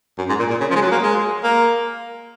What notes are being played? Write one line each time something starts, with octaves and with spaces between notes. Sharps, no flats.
F#2
G#2
A#2
A#2
C#3
F3
G#3
F#3
A#3
G#3
A#3